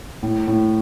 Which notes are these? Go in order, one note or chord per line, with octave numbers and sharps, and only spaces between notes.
A2
A2